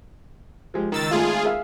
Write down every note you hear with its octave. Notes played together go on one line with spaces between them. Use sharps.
F3 G#3 G4
C#2 D#3 E6 A6
G#1 A3 F4 G#4 A4
G#4 E5 F5